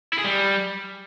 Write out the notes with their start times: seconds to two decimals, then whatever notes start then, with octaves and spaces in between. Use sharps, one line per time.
0.13 E4
0.19 G#4
0.24 G3